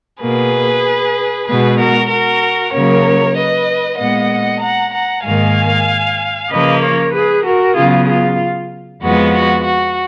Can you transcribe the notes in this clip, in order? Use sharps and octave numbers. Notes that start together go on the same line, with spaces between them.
B2 A#3 G#4 B4
B2 G#3 B3 G#4 B4
F#4 A#4
F#4 A#4
C#3 F#3 A#3 A#4 C#5
B4 D#5
A#2 G#3 B3 D#5 F#5
F#5 A#5
F#5 A#5
G#2 D#3 A#3 F5 G#5
C#3 F3 A#3 B4 D#5
A#4 C#5
G#4 B4
F#4 A#4
C#3 F#3 B3 F4 G#4
F4
F2 F3 G#3 B3 F#4
F#4
F#4